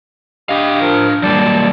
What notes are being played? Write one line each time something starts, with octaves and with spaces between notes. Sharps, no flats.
D4 G4 D#5 F5
F3 A#4
F#3 G3 A#3 D5 A5